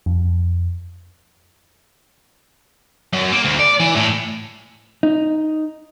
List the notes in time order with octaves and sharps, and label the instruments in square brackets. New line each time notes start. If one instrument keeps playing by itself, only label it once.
[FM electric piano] F2
[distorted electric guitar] F#2
A#3
D2
D5
E3
A2
[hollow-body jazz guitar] D#4